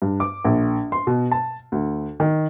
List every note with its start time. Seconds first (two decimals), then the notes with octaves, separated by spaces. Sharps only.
0.02 G2
0.20 D6
0.45 A#1
0.92 C6
1.07 B2
1.32 A5
1.72 D2
2.20 D#3